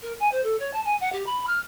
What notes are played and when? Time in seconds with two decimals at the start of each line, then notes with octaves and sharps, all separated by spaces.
0.02 A#4
0.20 G#5
0.32 C5
0.43 A4
0.59 C#5
0.73 A5
0.85 G#5
1.00 F#5
1.12 G4
1.26 B5
1.47 F6